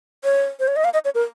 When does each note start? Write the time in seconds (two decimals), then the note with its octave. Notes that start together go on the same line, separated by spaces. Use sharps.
0.24 C#5
0.60 C5
0.68 C#5
0.76 D#5
0.84 F5
0.94 D#5
1.05 C#5
1.15 A#4